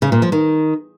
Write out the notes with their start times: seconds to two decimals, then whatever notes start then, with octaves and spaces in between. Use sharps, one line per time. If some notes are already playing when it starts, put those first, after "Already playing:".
0.02 C#3
0.12 A#2
0.22 F3
0.32 D#3